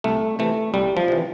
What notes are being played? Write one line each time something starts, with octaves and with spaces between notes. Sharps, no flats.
C2 A3
C3 E3 A3
C2 G3
F3
C3 E3